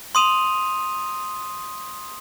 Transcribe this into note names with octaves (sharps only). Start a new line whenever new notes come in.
C6 D#6 D#7 F7